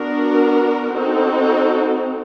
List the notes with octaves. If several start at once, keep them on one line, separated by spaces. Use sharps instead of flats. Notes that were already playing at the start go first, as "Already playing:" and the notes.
Already playing: B3 D4 F#4 A#4
C4 D#4 F#4 A4